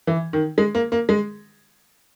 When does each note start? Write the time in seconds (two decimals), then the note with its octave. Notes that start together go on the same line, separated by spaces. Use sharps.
0.07 E3
0.33 D#3
0.58 G#3
0.75 A#3
0.92 A#3
1.09 G#3